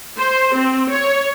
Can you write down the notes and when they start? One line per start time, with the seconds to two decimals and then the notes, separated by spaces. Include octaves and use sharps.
0.18 C5
0.55 C4
0.90 C#5